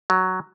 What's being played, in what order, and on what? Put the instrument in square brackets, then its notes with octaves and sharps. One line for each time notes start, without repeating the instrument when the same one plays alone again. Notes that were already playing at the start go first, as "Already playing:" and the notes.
[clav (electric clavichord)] F#3